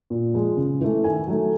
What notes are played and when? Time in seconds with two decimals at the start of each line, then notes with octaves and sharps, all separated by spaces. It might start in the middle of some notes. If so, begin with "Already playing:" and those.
0.10 A#2
0.34 F3 G#3
0.57 C#3
0.81 E3 A3
1.04 D#3 G#5
1.27 F#3 A3